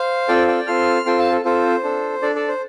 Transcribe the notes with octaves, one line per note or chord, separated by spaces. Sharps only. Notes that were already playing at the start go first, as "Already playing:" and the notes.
Already playing: C5 F5
C4 F4 A4 D5 G5
D5 G5
C4 F4 A4 C6 F6
C4 F4 A4 G5 C6
F5 A5
A4
C4 F4 A4 C5
D4 A4
D4 A4 D5
A4 D5
C5